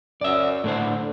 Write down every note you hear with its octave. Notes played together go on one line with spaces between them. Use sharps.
F#2 D5 E5
A2 D3 D4 C5